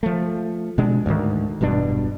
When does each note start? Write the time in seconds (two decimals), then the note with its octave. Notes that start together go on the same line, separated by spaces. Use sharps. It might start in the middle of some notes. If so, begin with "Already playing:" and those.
0.03 F3 A3
0.78 B2 G#3 D4
1.06 D2 G#2 C3 D#3
1.61 E1 G2 B2 D4